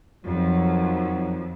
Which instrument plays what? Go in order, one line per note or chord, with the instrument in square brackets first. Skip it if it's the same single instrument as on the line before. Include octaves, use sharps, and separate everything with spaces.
[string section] F2 [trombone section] D#3 F3 F#3